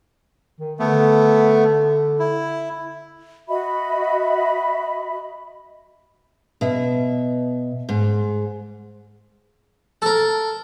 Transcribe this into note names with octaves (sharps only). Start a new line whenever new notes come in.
D#3
D3 A3 B3
E4
F#4 D#5 E5 B5
B2 E5
G#2
A4 A#4